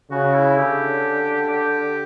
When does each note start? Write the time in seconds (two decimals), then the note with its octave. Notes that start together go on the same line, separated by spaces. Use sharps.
0.11 C#3 F#4
0.34 E4
0.57 D3 G4
1.50 G4